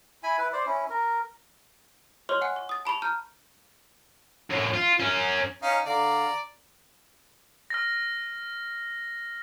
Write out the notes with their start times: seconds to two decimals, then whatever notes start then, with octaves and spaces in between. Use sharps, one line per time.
0.23 E4 G#5 B5
0.38 E4 B4
0.52 C5 D5
0.66 C#4 E4
0.90 A#4
2.29 C#5 D#5 C6 C#6 F6 F#6
2.41 F#5 G#5 F#6
2.56 C#6
2.69 D#6 A6
2.85 A5 B5 C#6 F7
3.02 A#5 F6 G6
4.51 F#2 A2
4.74 F4
5.00 F#2 C#4
5.62 C#4 D#4 F5
5.86 D3 D5 F5 A#5
7.70 F6 A#6